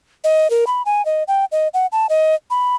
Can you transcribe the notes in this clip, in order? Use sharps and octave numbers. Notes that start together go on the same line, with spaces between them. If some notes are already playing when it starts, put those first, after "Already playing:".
D#5
A#4
B5
G#5
D#5
G5
D#5
F#5
A5
D#5
B5